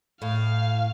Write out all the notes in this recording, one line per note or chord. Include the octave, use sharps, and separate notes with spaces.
A2 F5